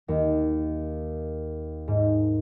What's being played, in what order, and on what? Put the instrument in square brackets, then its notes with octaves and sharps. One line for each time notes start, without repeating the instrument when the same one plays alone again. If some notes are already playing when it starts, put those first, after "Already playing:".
[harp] D#2
G#2